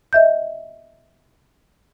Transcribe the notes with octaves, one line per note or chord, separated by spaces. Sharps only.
D#5 E5 G6